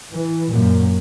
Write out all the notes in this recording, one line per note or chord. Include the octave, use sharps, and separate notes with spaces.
E3
F#2 A#2